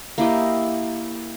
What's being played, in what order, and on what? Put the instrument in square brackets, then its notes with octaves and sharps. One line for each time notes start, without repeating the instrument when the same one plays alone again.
[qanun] A#3 E4 G4 D#5